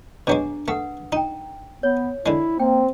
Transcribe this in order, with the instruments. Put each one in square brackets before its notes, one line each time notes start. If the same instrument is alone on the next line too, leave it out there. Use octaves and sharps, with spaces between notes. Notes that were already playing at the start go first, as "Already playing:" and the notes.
[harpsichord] B2 F#3 G#3 [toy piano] D4 G#4 A#5
[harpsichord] A3 [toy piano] B4 F#5 D#6
[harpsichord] D#4 [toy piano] G5 A#5
[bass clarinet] B3 [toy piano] C#5
[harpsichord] D3 G#3 [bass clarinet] E4
[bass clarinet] A#3 [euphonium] C4 [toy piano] G5